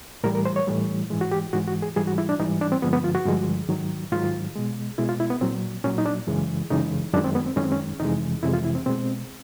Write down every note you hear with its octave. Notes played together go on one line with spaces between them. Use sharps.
A2 E3 G3 A#4
A#4
C5
C#5
A2 E3 G3
G#2 E3 G#3
F#4
G4
G#2 E3 G#3 F#4
F#4
G#4
G#2 E3 G3 G#4
F#4
E4
D4
G#2 E3 G3 D#4
D4
C4
G2 D3 F3 G#3 B3
B3
F4
F#4
G2 D3 F3 G#3
G#2 D#3 F#3
G#2 D#3 F#3 F4
B2 G#3
B2 G#3 E4
F4
E4
B3
A#2 F#3 C4
A#2 F#3 C#4
D#4
D4
F#2 C#3 E3 G#3
F#2 C#3 E3 G#3 D#4
F#2 D#3 G#3 D4
C4
B3
C4
F#2 D#3 G#3 C#4
C4
C#4
F2 C3 E3 G#3 D#4
F2 C3 E3 G#3 E4
F4
E4
C4
B2 G#3 C4